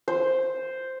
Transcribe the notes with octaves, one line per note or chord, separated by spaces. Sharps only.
C5